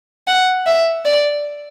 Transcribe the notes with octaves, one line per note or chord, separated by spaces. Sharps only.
F#5
E5
D5